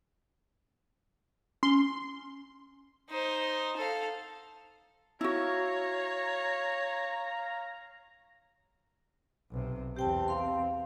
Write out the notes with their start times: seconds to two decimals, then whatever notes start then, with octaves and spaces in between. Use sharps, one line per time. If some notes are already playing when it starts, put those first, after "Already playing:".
1.63 C#4 C6
3.10 D#4 C5
3.77 A4 F5
5.21 E4 F#4 C#5 F5 A#5
9.51 B1 C3
9.96 E2 C4 G4 G5 A5
10.28 F5 C6